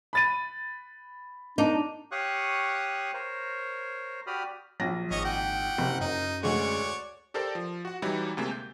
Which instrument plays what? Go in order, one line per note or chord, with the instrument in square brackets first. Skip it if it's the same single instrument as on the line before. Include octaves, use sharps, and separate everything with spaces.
[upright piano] B5 A6 D#7
[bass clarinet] D4 [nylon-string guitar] D#4
[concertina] G4 C#5 F5 C#6 D#6 F#6
A#4 C5 C#5
F#4 G4 D5 B5 D#6 F6
[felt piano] A#1 A#6 [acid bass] F#3
[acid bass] G#1 [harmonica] C#5 D#5
[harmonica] F#5 G5
[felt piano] F#1 [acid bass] C3
[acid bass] F#2 [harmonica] D#4
[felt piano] D2 G#3 [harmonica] F#4 C#5 D5
[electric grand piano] G4 A4 A#4 C5 D5 A5
F3
F#4 F#5
E3 F#3 G3 D#4 E4
D2 C3 G#3 A#3
G6